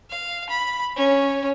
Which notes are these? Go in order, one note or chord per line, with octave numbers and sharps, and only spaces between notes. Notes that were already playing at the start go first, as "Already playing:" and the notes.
F5
B5
C#4